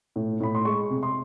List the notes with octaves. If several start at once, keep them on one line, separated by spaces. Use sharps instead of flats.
A2
A2 B5
C6
G#3 C#6
C3
C6